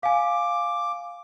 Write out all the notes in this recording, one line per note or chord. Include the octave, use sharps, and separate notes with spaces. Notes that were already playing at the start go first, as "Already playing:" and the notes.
F5 G#5 D6